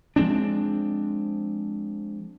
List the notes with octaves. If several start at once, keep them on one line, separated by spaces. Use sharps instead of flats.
F3 G#3 C4 D4